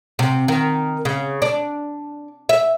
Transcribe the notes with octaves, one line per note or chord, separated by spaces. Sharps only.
C3
D#3
C#3
D4
E5